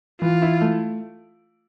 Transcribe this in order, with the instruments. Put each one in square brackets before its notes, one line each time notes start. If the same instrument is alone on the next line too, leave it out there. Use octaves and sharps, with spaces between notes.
[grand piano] E3 [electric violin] F4
[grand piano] E4
A3